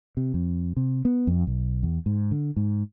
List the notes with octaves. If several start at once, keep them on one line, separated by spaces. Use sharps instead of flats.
C3
F2
C3
B3
F2
B1
E2
G#2
D3
G#2